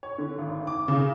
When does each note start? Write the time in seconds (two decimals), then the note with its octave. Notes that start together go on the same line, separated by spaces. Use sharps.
0.03 C#5
0.18 D3
0.38 G#1
0.67 D6
0.88 C#3